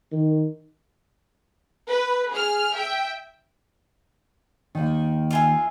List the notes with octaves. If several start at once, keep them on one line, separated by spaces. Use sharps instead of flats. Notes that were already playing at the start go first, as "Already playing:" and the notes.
D#3
B4
G#4 F6
E5 G5
D#2 D#3
F4 G#4 E5